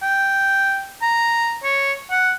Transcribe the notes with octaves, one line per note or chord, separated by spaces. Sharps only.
G5
A#5
C#5
F#5